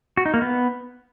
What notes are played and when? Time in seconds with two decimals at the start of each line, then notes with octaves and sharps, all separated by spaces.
0.17 F#4
0.26 D#4
0.34 A#3
0.42 B3